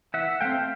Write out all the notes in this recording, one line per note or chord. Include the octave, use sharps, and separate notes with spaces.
E3 E5 F#5
A3 C4 F5 G5